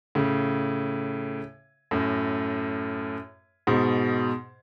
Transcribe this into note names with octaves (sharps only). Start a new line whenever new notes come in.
A2 C#3
F#2 A2
G#2 B2